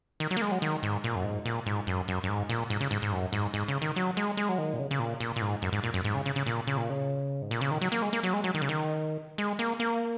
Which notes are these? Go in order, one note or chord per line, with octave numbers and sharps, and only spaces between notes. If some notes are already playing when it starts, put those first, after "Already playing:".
D#3
F#3
A#3
G#3
F#3
D#3
G#2
A#2
F#2
G#2
A#2
G#2
F#2
F#2
F#2
G#2
A#2
G#2
C#3
G#2
G#2
F#2
G#2
G#2
C#3
D#3
F#3
G#3
G#3
F#3
D#3
A#2
C#3
C#3
A#2
A#2
A#2
G#2
F#2
G#2
A#2
F#2
G#2
C#3
C#3
C#3
A#2
C#3
A#2
C#3
G#2
A#2
C#3
D#3
F#3
A#3
G#3
A#3
F#3
G#3
F#3
D#3
C#3
D#3
G#3
A#3
A#3